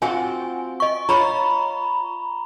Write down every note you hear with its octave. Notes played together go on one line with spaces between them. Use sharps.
C4 F4 F#4 G#5
D#5 C#6
F4 C#5 A#5 B5 C#6